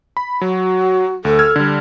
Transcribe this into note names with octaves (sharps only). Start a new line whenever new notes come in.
B5
F#3 F#4
D2 A4
E6 F6 G#6
D3 G3